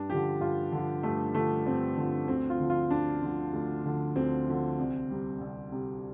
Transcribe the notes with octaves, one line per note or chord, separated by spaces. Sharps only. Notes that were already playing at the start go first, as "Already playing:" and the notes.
Already playing: G2 D4
D3 F3 G4
G2 F4
D3 F3
G2 A3
D3 F3 A3
G2 C4
D3 F3
D2 C4
F4
D3 F3
F4
D2 D4
D3 F3
D2
D3 F3
D2 C4
D3 F3
C2
C3 G3
C2
C3 G3